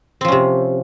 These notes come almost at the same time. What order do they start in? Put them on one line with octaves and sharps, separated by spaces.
C4 F3 C#4 C3